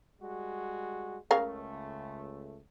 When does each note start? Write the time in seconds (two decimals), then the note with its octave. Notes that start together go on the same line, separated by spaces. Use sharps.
0.21 G3 G#3 F#4
1.31 C#2 C#3 A3 A#4 F5